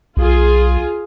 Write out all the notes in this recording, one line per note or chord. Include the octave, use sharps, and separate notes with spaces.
B1 F4 G#4